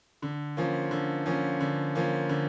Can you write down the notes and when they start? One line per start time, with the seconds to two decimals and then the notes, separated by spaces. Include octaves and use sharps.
0.22 D3
0.57 F3 A#3 C#4
0.91 D3
1.26 F3 A#3 C#4
1.60 D3
1.95 F3 A#3 C#4
2.29 D3